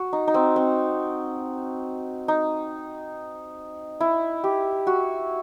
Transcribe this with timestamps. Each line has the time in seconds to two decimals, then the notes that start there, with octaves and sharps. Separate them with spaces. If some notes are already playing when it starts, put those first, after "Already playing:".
Already playing: F#4
0.13 D#4
0.28 D#4
0.34 C4
0.56 C4
2.28 D#4
4.01 E4
4.44 G4
4.87 F#4